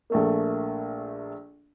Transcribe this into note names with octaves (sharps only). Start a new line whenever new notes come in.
A#1 A3 A#3